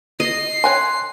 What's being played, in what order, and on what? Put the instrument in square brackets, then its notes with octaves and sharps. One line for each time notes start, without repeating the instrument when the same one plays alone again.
[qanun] D#5 [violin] C7
[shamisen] C#5 G5 G#5 [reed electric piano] C6 F#6